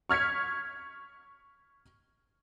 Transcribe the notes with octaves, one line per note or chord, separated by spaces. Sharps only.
C#6 F6 G#6 B6 C#7